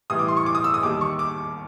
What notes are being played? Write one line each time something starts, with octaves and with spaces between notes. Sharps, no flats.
A2 E3 G3 D#6
D6
C6
C#6
D6
D#6
E6
D#6
D#2 D#3 G3 D6
C#6
D6